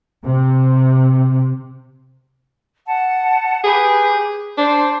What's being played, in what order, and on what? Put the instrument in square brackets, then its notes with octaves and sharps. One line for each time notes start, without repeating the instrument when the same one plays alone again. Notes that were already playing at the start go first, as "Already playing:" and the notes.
[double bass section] C3
[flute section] F#5 A5
[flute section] G4 B4 [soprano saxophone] G#4
[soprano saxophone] D4 [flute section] C5